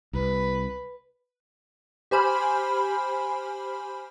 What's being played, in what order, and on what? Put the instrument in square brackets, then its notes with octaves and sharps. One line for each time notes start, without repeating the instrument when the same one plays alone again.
[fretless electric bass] C2 [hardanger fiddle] B4
[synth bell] G4 C5 G#5 B5 F6